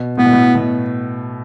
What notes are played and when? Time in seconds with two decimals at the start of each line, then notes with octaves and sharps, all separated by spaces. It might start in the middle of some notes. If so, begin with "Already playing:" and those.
Already playing: B2
0.17 A2 B3
0.25 B2
0.33 A2
0.55 B2